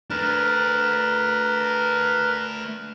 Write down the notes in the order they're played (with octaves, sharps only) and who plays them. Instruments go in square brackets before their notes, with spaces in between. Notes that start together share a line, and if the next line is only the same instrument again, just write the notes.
[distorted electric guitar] A3 D4 [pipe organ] A#4 B4